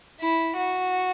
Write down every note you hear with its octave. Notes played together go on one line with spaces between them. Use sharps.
E4
F#4